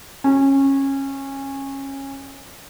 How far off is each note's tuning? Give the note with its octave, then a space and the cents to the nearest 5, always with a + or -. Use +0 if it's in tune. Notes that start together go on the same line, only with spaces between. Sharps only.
C#4 -20